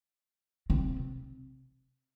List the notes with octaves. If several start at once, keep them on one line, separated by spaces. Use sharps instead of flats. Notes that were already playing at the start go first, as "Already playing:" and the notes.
C3